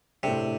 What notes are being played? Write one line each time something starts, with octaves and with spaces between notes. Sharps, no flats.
A2 C3 A3 D4